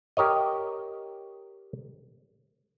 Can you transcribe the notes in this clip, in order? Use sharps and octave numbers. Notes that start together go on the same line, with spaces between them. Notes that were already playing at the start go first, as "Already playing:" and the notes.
G4 A#4 C#5 D#5